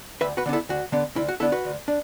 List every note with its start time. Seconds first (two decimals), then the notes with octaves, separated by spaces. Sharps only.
0.21 D2 B4 E5
0.37 F#4 B4
0.46 D3 B3 D4
0.53 E4 A4
0.69 D2 F#4
0.92 D3 B3 D4
1.16 D2 E4
1.29 F#4
1.40 D3 B3 D4 E4 A4
1.52 F#4 B4
1.65 D2
1.88 D4